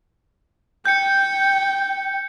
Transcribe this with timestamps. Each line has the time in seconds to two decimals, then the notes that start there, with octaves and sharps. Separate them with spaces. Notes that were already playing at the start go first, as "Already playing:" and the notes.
0.85 G5 G6 C#7